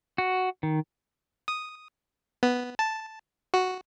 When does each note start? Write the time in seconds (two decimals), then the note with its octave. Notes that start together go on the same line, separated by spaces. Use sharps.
0.18 F#4
0.63 D#3
1.48 D#6
2.43 B3
2.79 A5
3.54 F#4